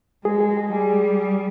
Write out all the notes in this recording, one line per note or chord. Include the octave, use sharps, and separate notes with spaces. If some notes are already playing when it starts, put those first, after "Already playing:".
G#3 G#4
G#4
G#4
G3 G#4